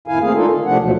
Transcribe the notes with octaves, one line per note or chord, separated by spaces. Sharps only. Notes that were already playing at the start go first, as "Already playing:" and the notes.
F2 A2 D#3 E4 F5 G#5
A3 A#3 C4 G#4 F5
G#3 D4 D#4 F4 A4 A#4
D3
C3 F3 A3 D4 F#5
D#2 B2 F3 F#3 A3